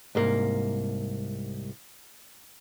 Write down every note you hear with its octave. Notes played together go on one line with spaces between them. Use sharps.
C2 G#2 A#3